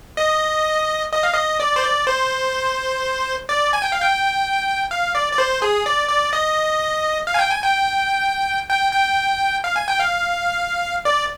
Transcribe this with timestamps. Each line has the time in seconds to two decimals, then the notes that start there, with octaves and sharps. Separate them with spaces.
0.17 D#5
1.13 D#5
1.23 F5
1.33 D#5
1.60 D5
1.76 C5
1.83 D5
2.07 C5
3.49 D5
3.73 G#5
3.82 G5
3.92 F5
4.02 G5
4.91 F5
5.15 D5
5.32 D5
5.38 C5
5.62 G#4
5.86 D5
6.09 D5
6.33 D#5
7.27 F5
7.34 G#5
7.39 G5
7.50 G#5
7.63 G5
8.69 G5
8.92 G5
9.64 F5
9.76 G#5
9.88 G5
9.99 F5
11.05 D5